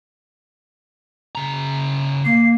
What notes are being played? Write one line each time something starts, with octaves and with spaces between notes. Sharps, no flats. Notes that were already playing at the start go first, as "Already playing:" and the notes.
C#3 A#5
A#3 C7